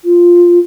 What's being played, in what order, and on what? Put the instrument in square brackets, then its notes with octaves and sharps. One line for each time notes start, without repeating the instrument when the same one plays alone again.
[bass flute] F4